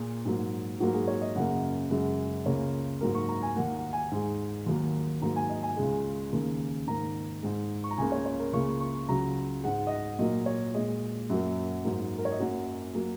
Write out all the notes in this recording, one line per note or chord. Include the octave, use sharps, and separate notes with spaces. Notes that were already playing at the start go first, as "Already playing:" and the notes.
Already playing: A#2 A#3 G#4
G#2 F#3 A#3
G#2 F#3 A#3 F#4
G#4
C#5
D#5
F#2 C#3 A#3 F#5
F#2 C#3 G#3
C#2 C#3 A#3 C#5
G#2 F#3 A#3 A#4
C#6
A#5
G#5
D#2 D#3 A#3 F#5
F#5
G#5
G#2 G#3
D#2 D#3 F#3 A#3
G#2 F#3 A#3 A#5
G#5
D#5
G#5
C#2 C#3 G#3
D#2 C#3 A#3
G#2 D#3 A#3 A#5
G#2 G#3
C#6
A#5
C#2 C#3 A#3 G#5
C#5
C#5
A#4
C#2 C#3 A#3 C#6
C#6
C#2 C#3 F#3 A#5
G#2 G#3 F#5
D#5
F#5
A#2 F#3 A#3 D#5
C#5
A#2 G#3 D#5
F#2 F#3 A#3
G#2 F#3 A#3
A#4
C#5
D#5
F#2 F#3 A#3 F#5
F#3 A#3